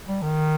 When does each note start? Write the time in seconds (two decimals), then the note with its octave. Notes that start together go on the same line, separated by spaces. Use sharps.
0.09 G3
0.22 D#3